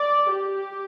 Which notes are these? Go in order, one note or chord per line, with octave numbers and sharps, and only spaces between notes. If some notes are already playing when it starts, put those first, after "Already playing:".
Already playing: D5
G4